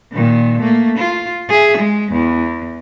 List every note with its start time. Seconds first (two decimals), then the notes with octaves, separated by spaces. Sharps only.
0.12 A#2 D#3
0.60 A3 A#3
0.98 F4
1.49 G#4 E5
1.78 G#3
2.12 E2